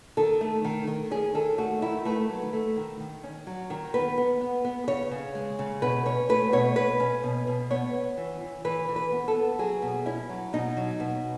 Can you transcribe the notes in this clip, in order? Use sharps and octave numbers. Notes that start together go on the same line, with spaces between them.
D#3 A4
A3
D#3
D#3
C#4 G#4
D#3 A4
A3 F#4
D#3 E4
A3 B4
F#3
A3
D#3
D#3
C#4
F#3
D#3
B3 B4
B3
B3
B3
C#3 C#5
C#3
G#3
C#3
B2 B4
C#4 C#5
A3 B4
B2 C#5
B2 B4
C#4
B2
B2
B3 C#5
B3
E3
E3
E3 B4
E3
B4
B3
A4
B3
F#3 G#4
B2
C#4 E4
F#3
B2 D#4
F#3
B2